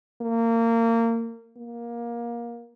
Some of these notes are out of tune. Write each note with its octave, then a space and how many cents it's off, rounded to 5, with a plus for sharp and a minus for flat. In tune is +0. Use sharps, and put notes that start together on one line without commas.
A#3 -25
A#3 +20